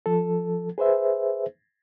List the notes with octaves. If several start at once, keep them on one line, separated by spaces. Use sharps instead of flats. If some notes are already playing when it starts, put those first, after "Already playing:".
F3 A4
G#4 B4 C5 E5